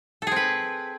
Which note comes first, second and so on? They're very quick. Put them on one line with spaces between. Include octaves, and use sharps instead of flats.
A4 G#4 C4 B4